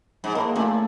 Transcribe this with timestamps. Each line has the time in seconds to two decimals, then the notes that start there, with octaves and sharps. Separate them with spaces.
0.24 G#2
0.35 A2 A#3
0.56 A#2 A3